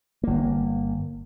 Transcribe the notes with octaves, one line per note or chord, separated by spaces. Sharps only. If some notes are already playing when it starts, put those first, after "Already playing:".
G1 A#3